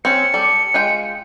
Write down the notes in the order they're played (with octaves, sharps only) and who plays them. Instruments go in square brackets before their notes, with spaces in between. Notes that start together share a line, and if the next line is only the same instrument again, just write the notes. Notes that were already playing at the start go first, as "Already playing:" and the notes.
[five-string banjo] C4 C#4 [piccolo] C#7
[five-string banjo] G3 A4
G#3 F4 G5